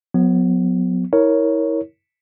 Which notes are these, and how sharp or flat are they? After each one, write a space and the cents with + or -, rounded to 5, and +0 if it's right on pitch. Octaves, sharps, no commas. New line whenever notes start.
F#3 -30 B3 +15
E4 -30 A#4 +0 C#5 +0